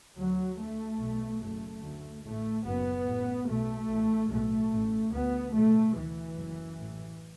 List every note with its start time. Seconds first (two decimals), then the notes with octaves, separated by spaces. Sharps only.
0.16 D2 F#3
0.58 D2 A3
0.98 B1 B2
1.40 F#1 F#2 A3
1.82 D2
2.23 A1 A2 A3
2.64 F#1 F#2 B3
3.05 A1 A2
3.47 B1 B2 A3
3.88 A1 A2
4.30 B1 A2 A3
4.70 A1 A2
5.12 D2 B3
5.53 B1 A2 A3
5.95 D2 E3
6.36 F#1 F#2
6.77 A1 A2